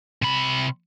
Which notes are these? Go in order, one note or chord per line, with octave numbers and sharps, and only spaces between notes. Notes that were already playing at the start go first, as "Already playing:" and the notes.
C3 B5